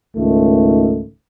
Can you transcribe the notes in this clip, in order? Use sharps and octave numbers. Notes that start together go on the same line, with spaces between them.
C#2 G#2 D#3 A3